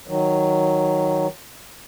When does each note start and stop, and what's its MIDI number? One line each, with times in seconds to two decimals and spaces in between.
0.08 1.27 51
0.08 1.27 54